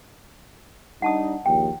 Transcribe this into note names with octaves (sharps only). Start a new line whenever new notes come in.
G3 D4 D#4 F#5 A5 D#6
A#1 D#2 G5